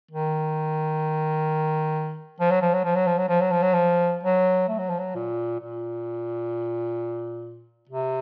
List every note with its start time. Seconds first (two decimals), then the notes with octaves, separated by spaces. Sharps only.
0.11 D#3
2.40 F3
2.51 F#3
2.62 F3
2.74 F#3
2.84 F3
2.95 F#3
3.07 F3
3.18 F#3
3.29 F3
3.41 F#3
3.52 F3
3.63 F#3
3.74 F3
4.23 F#3
4.68 A3
4.78 F#3
4.89 F3
4.99 F#3
5.15 A#2
5.60 A#2
7.89 C3